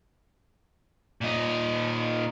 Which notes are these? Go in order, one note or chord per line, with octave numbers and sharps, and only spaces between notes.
A#2 D#4